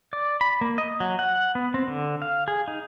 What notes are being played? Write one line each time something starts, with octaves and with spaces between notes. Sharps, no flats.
D5
B5
A#3
D#5
F#3
F#5
B3
C4
D3
F5
G#4
D#4